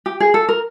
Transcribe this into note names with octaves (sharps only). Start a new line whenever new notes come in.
G4
G#4
A4
A#4